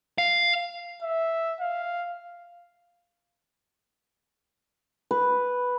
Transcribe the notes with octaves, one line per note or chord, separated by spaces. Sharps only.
F5
E5
F5
B4